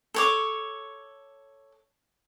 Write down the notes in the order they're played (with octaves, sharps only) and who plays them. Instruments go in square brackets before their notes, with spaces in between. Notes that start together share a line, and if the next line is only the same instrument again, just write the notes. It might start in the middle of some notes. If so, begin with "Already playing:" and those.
[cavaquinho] A4 C#5 D6